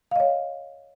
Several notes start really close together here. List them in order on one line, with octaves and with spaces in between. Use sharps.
F5 D#5 C#5